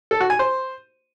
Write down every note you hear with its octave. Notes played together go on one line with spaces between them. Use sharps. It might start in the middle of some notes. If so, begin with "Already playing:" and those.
A4
F#4
G#5
C5